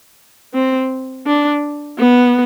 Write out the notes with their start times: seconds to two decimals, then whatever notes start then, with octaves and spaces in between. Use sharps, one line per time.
0.54 C4
1.26 D4
1.99 B3